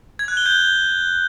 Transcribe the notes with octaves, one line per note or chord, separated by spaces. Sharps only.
G#6
F#6
G7
G6